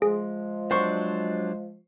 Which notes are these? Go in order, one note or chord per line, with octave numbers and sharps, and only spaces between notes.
F3 G#3 G#4
F#3 D4 C5 C#6